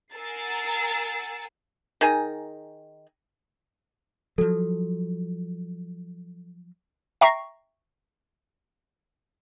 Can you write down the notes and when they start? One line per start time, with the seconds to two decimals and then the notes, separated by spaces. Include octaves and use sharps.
0.13 A#4 F#5 G#5 E6 A6 C7
2.01 D#3 G#4 G#5 A#5
4.38 F3 F#3 A4
7.21 E5 G5 A#5 C#6 A#6 C7